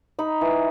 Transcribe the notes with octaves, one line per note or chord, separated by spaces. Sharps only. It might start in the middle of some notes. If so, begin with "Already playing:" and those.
D#4 B5
E3